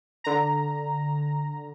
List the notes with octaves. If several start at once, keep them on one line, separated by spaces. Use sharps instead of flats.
D3 A#5